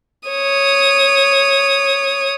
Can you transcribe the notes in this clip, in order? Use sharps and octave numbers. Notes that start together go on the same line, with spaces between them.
C#5 D#6